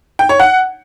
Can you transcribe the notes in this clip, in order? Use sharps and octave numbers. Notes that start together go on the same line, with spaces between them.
G5
C#5
F#5